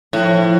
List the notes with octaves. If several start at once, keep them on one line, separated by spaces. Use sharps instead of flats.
A2 F3